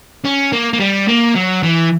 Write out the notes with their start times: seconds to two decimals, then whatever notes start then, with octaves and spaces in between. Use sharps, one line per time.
0.25 C#4
0.53 A#3
0.73 A#3
0.80 G3
1.08 A#3
1.35 F#3
1.63 E3